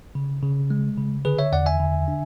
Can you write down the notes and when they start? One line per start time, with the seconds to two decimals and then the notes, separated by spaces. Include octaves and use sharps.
0.15 C#3
0.43 C#3
0.70 G#3
0.98 C#3
1.25 D3 G#4 B4
1.39 C#5 E5
1.52 E2 D5 F#5
1.66 E5 G#5
1.80 D3
2.08 D4